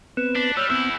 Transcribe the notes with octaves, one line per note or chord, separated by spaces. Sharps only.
B3 C4 B4 F#6 C#7 E7
D4 B6
G3 C#5 E6 F6
E2 B3 C4 E4 E6 G6 C#7 F#7